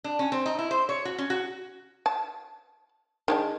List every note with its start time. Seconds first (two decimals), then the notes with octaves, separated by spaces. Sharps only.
0.04 D4
0.19 C#4
0.32 C4
0.46 D#4
0.59 E4
0.71 C5
0.89 C#5
1.05 F#4
1.18 C#4
1.30 F#4
2.06 A5
3.28 D#3 G#3 D4